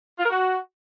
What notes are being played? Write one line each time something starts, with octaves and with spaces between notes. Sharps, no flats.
F4
A#4
F#4